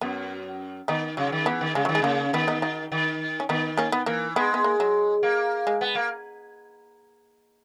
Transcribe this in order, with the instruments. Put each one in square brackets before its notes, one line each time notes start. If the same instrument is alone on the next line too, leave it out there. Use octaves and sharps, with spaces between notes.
[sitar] F#2 [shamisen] B3
[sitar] D#3 [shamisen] B3 D#4
[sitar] C#3 [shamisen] F#3
[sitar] D#3
[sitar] E3 [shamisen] B3
[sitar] D#3
[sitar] C#3 [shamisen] G#3
[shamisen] F#3
[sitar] D#3
[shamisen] G#3
[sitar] C#3 [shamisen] A#3
[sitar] D#3 [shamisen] B3
[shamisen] B3 D#4
D#4 F#4
[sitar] D#3
[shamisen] C#4
[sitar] D#3 [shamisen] B3 D#4
[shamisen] A#3 C#4
B3
[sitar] E3 [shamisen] A#3
[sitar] G#3 [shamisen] B3
[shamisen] B3
A#3
F#3
[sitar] A#3
[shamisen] G#3
[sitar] B3
A#3